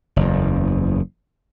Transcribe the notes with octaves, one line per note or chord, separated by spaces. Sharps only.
F#1 E2